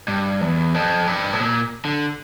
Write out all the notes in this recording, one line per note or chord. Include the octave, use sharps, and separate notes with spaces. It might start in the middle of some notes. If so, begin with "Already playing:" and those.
G2
E2
F2
G2
A2
A#2
D3